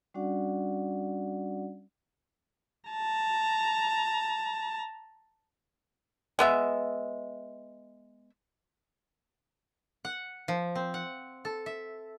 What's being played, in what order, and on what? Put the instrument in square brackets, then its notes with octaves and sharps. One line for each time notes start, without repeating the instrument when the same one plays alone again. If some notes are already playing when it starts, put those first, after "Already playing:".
[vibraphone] G3 C#4 D4 F#4 D5 F#5
[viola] A5 A#5
[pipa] G#3 B3 E5
[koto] F#5
F3
C4
F#5
A4
E5